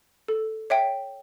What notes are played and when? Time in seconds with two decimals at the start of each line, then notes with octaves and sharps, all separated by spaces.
0.28 A4
0.70 C#5 E5 G5